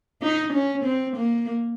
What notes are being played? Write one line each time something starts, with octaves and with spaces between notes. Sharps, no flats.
D#4
C#4
C4
A#3